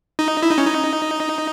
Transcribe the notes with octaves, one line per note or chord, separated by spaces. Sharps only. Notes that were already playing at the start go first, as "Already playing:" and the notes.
D#4
E4
D#4
C#4
D#4